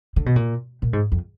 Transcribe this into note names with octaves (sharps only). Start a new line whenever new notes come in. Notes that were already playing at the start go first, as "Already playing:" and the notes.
D3
B2
A#2
A#2
G#2
F2